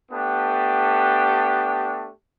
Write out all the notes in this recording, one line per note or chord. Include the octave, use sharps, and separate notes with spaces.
A3 B3 D4 G4